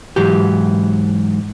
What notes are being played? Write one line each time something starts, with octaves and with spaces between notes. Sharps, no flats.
G#2 E3 F#3 G4